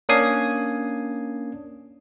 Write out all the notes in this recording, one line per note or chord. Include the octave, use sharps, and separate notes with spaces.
A#3 C#4 D4 D#6 G#6 C7